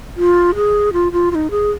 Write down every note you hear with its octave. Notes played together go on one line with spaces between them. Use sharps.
F4
G#4
F4
F4
F4
D#4
G#4